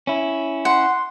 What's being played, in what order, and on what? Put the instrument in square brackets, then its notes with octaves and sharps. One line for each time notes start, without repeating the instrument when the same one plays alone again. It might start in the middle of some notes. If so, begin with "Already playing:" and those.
[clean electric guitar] C#4 E4
[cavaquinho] F#5 [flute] C6